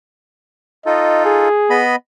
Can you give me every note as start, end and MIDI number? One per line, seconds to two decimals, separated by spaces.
0.86 1.49 63
0.86 1.49 65
0.86 1.49 69
0.86 1.24 75
1.25 1.82 68
1.70 1.96 59
1.70 1.96 75
1.70 1.96 83